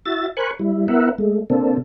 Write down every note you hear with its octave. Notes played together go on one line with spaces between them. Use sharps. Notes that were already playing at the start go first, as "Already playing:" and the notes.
E4 F#4 E5 A6
A#4 C5 G#5 B5 C#6 F#6
G3 E4
B3 E4 A#4 E5 F#5
G#3 A3
C3 A#3 C4 D4 A4